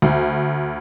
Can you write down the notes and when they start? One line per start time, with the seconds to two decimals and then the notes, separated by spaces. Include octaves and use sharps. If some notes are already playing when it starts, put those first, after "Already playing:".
0.02 D2